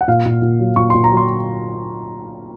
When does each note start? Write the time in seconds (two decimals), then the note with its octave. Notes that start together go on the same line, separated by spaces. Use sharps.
0.01 F#5
0.08 A#2 F5
0.26 A#2
0.42 A#2
0.60 F#3
0.76 A#2 C#6
0.90 A#2 C6
1.04 A#5
1.11 F#3
1.17 C6